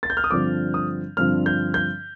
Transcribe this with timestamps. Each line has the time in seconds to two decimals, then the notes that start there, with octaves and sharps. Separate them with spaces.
0.03 A6
0.10 G6
0.17 F6
0.24 D#6
0.30 G2 D3 F3 C4 D6
0.74 D#6
1.17 G2 D3 F3 C4 F6
1.46 G6
1.74 G6